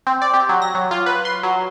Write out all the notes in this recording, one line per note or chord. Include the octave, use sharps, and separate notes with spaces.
C4
D5
G4
F#3
A#6
F#3
F4
B4
C6
F#3